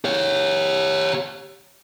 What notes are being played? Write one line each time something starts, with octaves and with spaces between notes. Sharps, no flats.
G4 C#5